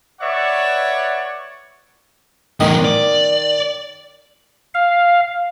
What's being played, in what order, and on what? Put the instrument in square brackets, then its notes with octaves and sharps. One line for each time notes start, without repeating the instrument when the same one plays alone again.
[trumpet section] B4 C#5 D5 E5 F#5 C#6
[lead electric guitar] E2 A2 [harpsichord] D#3 D#6
[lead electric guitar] D5
[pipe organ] F5